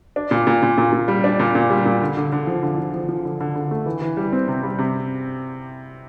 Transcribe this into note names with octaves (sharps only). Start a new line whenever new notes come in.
D4
A#2
A#2
A#2
A#2
A#2
G3
D4
A#2
A#2
G3
A#2
D3
D3
D3
F3
D3
F3
F3
F3
D3
D3
D3
A3
E3
E3
G3
C4
C3
G3
C3